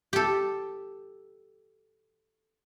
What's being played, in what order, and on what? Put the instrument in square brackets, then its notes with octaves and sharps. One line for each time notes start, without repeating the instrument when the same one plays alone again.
[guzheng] G4 A4